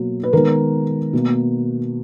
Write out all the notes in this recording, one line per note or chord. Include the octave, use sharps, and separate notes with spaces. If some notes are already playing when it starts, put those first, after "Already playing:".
Already playing: B2 F#3 A#3
B4
D#3 G#3 B3 A#4
B2 A#3